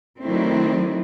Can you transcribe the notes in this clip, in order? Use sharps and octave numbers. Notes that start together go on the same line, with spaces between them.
D#3 F#3 A3 C4 D4 E4